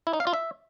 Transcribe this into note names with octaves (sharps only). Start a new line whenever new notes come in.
E4
D#4
F5
F4
E5